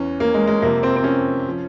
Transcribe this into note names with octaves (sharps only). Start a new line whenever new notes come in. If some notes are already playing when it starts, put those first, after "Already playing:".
Already playing: E2 E3 C#4
A#3
G#3
G#3
F2 C3 F3 A#3
C4
C4
C#4
F3